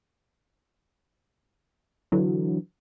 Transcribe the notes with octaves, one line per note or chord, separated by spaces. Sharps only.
D3 E3 F#3